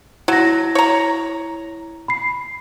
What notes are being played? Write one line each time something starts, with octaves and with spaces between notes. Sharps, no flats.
F#3 E4 A#6
C#5 A#5
B5 C7